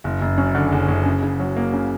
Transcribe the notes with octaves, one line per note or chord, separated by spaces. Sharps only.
F#1
F#1
F#2
D3
F#1
F#1
C#3
C#3
F#3
A#3
C#3